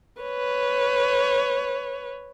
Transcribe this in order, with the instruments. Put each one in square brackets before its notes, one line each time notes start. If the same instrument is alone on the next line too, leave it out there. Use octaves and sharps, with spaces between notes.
[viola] B4 C#5